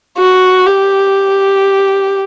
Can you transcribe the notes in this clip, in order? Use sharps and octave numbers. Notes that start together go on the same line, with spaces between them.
F#4
G4